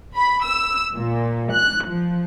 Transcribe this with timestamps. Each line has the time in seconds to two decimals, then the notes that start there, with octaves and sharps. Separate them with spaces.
0.16 B5
0.45 E6
0.95 A#2
1.54 F#6
1.88 F3